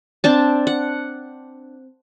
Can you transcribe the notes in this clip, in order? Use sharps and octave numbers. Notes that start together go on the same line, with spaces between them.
C4 D4 A5
F#5